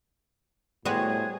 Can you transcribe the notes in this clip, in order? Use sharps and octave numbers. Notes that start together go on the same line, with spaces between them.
A2 G3 B3 F#4 G#4 C5 F5